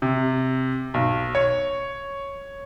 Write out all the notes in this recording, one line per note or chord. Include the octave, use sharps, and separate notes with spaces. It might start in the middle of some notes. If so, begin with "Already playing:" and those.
C3
B1
C#5